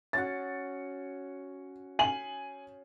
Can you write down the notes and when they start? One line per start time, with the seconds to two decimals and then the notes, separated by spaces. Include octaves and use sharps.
0.13 C#4 F#4 F#5 A6
1.99 G#5 F#7